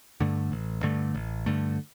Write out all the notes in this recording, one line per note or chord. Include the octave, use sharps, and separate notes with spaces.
G2 D3 A3
A1
G2 D3 A3
A1
G2 D3 A3